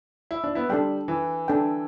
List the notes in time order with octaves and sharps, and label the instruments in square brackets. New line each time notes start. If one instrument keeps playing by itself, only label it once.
[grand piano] E4
D4
B3 E4
[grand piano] G3 [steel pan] D4 A4 G5
[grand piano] E3
[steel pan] D4 A4 G5